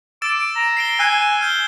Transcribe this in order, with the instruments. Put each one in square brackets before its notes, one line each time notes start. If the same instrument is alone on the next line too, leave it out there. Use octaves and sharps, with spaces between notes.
[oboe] D6 [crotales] E6 A6 E7
[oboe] A#5
[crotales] C7 D7 G7
[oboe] G#5 [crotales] E6 F#6 C7
[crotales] F6 G6 G7